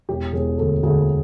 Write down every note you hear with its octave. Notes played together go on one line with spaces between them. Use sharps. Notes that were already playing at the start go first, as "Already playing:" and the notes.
E1 G4
E1 G#4
D2 A4
D2 G#4